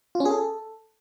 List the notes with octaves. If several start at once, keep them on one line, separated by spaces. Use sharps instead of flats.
F4
C#4
G#4
A4